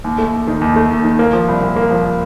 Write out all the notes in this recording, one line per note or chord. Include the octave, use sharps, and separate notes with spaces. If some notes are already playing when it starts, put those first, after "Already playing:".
D#2
A3
D#2
D#3
D#2
A3
D#2
D#3
A#3
F3
C2
A#2
A#3
F3